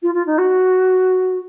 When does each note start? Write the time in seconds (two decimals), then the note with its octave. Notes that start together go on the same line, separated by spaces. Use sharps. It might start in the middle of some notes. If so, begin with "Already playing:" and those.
0.02 F4
0.14 F4
0.26 D#4
0.38 F#4